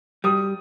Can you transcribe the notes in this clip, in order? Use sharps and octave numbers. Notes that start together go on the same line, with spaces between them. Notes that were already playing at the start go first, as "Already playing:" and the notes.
G3 D#6